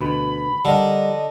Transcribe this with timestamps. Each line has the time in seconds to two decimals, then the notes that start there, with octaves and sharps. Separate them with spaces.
0.01 D2 B2 B5
0.65 D3 G3 A#4 D#5